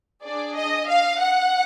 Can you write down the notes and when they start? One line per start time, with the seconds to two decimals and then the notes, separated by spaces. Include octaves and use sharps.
0.24 D4 G#4 D5
0.56 D#5
0.88 F5
1.21 F#5